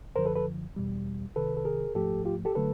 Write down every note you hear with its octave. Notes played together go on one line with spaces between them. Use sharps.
F#2 D3 F3 A#4 C5
A4 B4
A4 B4
E2 B2 G3
C2 C3 D#3 A4 B4
A4
G#4 A#4
G#2 F3 A3 G4 A4
F4 G4
G4 A4
D3 F#3 A3 A4 B4